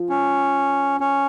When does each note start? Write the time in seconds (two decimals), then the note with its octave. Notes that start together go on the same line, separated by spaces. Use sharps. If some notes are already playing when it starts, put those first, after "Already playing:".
Already playing: F3
0.09 C#4
1.00 C#4